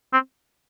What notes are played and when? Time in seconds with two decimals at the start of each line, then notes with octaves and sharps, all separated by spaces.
0.13 C4